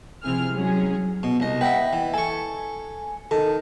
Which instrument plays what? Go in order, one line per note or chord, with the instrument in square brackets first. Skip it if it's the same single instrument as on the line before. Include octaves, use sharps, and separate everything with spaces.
[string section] C3 F3 C4 E4 G#4 F6
F#3 G#3 C#4 G#4
[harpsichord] B2
C2 D#5
[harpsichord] B4 D#5 E5 [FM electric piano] F#5 G5
[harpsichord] E3
[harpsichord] A4 C#6 [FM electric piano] G#5
[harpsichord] D#3 [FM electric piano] A4